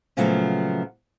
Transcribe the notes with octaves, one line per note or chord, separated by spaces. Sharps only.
A#2 C#3 F3 F#3 A3 B3